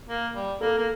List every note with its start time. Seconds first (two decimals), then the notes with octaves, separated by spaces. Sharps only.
0.09 A#3
0.35 G3
0.61 A#3 A4
0.78 A#3